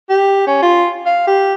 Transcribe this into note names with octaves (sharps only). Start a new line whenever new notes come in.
G4
C#4
F4
F5
G4